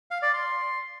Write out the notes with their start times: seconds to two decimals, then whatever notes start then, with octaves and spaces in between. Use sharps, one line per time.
0.11 F5
0.22 D5
0.34 C6